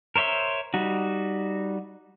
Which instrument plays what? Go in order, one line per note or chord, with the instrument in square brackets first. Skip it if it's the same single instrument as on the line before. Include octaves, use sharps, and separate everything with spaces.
[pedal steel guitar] A#4 C5 C#5 E5 C6
G3 D#4 F#4